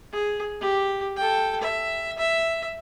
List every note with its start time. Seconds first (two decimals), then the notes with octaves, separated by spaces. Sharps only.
0.13 G#4
0.61 G4
1.17 A4 G5
1.61 E5
2.18 E5